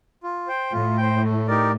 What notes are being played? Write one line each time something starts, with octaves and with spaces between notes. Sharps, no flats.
F4
C5 G5
A2 F4
C5 G5
A3
D#4 G4 A#4 D5